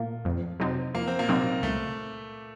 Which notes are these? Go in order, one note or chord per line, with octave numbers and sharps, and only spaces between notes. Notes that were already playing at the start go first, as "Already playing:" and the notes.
Already playing: A#2 F3 A#3
F2
C3 F#3 C4 D#4
F2 A#3
C4
A#2 A#3
C3 F#3 C4 D#4
C#2 A3